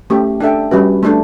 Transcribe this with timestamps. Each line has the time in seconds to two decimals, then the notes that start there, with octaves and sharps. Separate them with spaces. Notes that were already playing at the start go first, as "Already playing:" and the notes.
0.10 A3 C#4 G4
0.40 D4 A4 E5 G5
0.71 G3 C#4 F#4 B4
1.03 A3 D4 A4